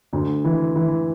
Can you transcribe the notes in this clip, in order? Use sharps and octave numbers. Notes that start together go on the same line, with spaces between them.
D2
E3
E3